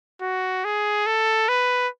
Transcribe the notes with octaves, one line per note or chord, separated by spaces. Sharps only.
F#4
G#4
A4
B4